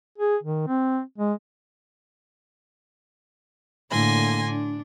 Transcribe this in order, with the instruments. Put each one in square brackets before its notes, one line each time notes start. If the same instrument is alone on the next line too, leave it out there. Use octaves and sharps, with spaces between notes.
[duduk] G#4
D#3
C4
G#3
[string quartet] A2 D3 A#3 G#5 C6 A#6
D4